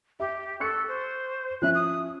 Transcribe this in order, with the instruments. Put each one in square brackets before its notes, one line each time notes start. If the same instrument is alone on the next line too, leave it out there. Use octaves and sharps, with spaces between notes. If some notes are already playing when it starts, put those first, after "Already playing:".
[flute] G4 [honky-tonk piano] E5
[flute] A4 [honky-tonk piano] C#6 F#6 C#7
[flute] C5
[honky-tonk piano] F3 C#4 E5 [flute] F#6
[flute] D#6